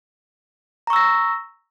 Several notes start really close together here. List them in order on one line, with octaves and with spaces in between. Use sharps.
A#5 C#6 E6 A#6